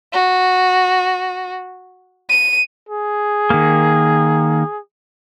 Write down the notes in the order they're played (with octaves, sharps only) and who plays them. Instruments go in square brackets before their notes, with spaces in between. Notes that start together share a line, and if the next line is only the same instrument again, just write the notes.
[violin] F#4
D#7
[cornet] G#4
[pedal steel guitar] D#3 A#3